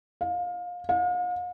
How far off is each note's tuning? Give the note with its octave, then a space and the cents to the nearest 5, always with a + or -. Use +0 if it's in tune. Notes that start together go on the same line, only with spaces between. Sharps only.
F5 +25
F5 +45